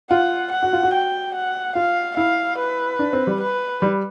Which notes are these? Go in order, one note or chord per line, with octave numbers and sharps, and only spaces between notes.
F4 F#5
F#5
F#4
F4
F#4
G5
F#5
F4 F5
E4 F5
B4
D4
C4
G3
B4
G3